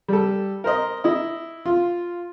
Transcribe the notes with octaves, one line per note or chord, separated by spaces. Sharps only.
G3 A4
A#4 C5 D#5
E4 D#5
F4